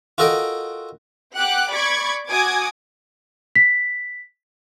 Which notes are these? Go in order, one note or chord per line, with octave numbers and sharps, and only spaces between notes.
F4 F#4 A4 A#4 D#5 G5
G4 F#5 G5 D6 F#6
D5 B5 C#6 D6 G#6
F#4 G#5 D6 D#6 G#6
B6